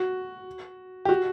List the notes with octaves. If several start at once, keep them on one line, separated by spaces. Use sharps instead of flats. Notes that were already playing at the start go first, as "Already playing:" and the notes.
Already playing: F#4
G4
F#4